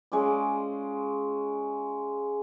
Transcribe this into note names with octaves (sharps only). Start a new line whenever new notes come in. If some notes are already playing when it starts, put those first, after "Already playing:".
G#3 C#4 F4 D5